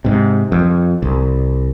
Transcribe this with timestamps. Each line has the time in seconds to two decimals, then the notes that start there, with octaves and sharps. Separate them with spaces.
0.05 G#2 C3
0.52 F2
1.02 C2